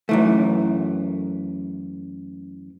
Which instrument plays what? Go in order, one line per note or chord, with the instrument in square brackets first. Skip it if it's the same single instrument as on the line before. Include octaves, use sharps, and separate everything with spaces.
[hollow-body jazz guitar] F#2 E3 A3